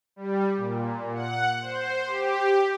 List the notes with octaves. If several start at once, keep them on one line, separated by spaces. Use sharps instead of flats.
G3
A#2
F#5
C5
G4